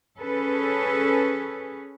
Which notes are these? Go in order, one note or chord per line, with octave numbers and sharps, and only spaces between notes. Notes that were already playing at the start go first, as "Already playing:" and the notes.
C#4 G#4 A4 B4